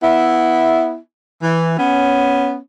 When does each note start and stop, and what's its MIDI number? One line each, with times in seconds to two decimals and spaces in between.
0.03 0.98 59
0.03 0.98 64
1.43 1.78 52
1.79 2.57 59
1.79 2.57 61